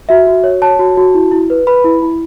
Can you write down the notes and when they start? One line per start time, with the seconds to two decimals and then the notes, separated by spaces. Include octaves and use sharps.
0.09 F#4 E5
0.27 F#4
0.44 C#5
0.62 C#5 A5
0.79 F#4
0.97 F#4
1.14 E4
1.32 E4
1.50 B4
1.67 B4 B5
1.84 E4
2.02 E4